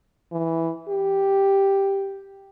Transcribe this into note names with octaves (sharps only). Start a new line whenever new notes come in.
E3
G4